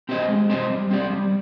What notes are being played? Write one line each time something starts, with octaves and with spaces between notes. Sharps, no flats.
C4 G4 C5 D#5
G#3
C4 G4 C5 D#5
G3
C4 G4 D5
G3